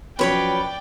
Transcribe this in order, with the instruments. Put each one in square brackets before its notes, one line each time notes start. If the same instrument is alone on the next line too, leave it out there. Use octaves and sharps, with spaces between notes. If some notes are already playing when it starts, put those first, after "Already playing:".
[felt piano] F3 F#3 C#4 [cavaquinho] B4 C#5 B5 [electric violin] D5 G5